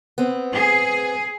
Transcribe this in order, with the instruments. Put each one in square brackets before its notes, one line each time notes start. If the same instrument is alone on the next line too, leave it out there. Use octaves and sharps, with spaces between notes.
[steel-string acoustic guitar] B3 C4
[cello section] G#4